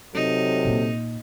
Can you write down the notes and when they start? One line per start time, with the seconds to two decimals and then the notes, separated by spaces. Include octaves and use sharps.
0.14 C3 F#3 D#4 A4
0.65 A#2 A#3